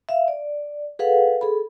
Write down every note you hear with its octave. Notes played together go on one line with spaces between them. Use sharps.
E5 F5
D5
G#4 A4 B4 F5 F#5
G#4 A4 B5